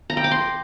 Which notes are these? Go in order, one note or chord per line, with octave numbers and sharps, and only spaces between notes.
A#5
G5
D6
C6